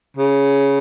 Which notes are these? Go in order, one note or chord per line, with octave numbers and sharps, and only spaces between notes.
C#3